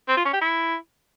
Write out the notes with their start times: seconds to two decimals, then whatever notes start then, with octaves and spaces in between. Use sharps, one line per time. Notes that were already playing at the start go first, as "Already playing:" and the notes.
0.09 C4
0.17 F4
0.25 C#4
0.33 G4
0.41 E4